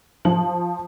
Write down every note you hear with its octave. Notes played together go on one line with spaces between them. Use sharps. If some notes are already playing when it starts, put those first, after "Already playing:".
F3 F#7